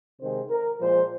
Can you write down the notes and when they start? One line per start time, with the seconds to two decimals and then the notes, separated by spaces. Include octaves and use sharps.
0.20 C3 D#3 G#3 C5
0.49 A#4
0.79 A#2 F3 G#3 C5